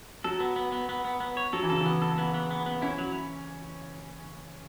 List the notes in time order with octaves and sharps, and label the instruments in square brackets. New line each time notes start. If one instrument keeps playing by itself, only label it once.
[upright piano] F#3 [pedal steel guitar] A4
[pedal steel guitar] B3
B3
B3
B3
B3
B3
C#5
[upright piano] F#3 [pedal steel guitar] A4
[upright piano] E3
[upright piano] C#3 [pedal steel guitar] A4
[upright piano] E3
[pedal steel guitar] B3
A4
B3
B3
B3
B3
[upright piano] C#4 [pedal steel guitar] E4
[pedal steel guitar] F#3